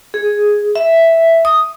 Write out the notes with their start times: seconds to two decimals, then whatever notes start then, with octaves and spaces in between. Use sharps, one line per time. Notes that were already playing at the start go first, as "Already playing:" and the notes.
0.14 G#4
0.75 E5
1.45 D#6